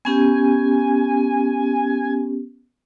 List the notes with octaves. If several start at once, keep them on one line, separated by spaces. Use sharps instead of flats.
B3 C#4 G4 G#5